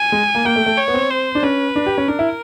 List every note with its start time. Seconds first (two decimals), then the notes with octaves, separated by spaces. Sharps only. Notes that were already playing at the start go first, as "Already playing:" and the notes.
Already playing: G#5
0.12 G#3
0.35 A#3
0.45 A#3 G5
0.56 A3
0.66 A3
0.78 C#5
0.88 B3
0.94 C4
1.10 C5
1.35 D4
1.43 C#4 B4
1.76 D4
1.86 G4
1.98 C#4
2.08 D4 A#4
2.19 E4